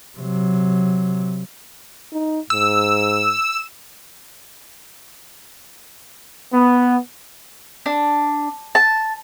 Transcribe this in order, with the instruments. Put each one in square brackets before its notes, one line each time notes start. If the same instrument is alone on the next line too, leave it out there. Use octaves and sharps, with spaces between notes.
[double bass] C3 F#3
[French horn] D#4
[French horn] G#2 [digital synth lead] E6
[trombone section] B3
[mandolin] D4
A5